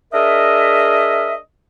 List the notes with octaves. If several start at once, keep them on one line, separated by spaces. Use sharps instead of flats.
D4 G#4 A#4 D#5 E5